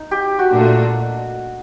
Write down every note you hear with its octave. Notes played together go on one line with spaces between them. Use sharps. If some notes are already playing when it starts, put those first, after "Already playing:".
Already playing: D#4
G4
F#4
A#2 A3 D4